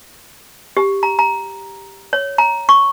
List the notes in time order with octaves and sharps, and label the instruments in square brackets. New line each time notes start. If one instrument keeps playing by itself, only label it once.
[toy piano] G4
A#5
A#5
C#5
A#5
C#6